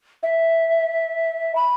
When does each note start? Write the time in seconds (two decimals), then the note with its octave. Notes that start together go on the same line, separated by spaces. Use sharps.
0.23 E5
1.56 B5